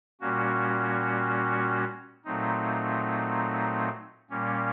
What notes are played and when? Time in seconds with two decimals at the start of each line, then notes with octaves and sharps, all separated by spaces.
0.20 A#2 G3 A#3 C#4 F#4
2.25 A#2 F#3 A3 C4 D#4
4.30 A#2 G3 A#3 C#4